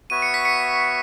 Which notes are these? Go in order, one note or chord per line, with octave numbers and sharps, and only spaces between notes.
B3 F#4 C#5 E5 D#7
C#7
B6
C#7